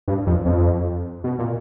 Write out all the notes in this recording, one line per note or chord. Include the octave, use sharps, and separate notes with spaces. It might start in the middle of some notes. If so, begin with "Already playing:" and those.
G2
F2
F2
B2
A#2